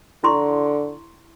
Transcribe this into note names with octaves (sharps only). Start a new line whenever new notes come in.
D3 E4 C6 C#6